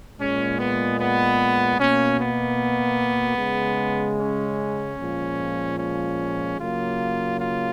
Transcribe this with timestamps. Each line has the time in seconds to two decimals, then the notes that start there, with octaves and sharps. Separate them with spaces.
0.18 A#2 G#3 C#4
0.58 B3
0.99 B3
1.78 B2 A#3 C#4
2.19 B3
3.38 C#3 G#3
4.18 C#4
4.99 A#2 F3 G#3
5.78 C#4
6.58 C#3 F#3 A#3 F4
7.39 F4